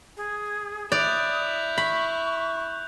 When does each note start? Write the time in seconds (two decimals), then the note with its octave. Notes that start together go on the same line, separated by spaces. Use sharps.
0.17 G#4
0.92 E4 D5 D#6 F#6 G6 F7
1.78 B5 C#6